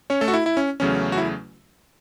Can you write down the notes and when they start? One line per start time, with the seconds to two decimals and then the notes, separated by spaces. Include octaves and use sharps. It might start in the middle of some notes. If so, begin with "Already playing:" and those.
0.10 C#4 C#5
0.21 A3 A4
0.28 F#4
0.34 E4
0.46 E4
0.57 C#4
0.80 E2 C#3 F#3 A3 C#4
1.12 F#4
1.18 E4